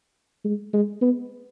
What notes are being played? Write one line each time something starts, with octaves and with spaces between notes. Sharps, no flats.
G#3
G#3
B3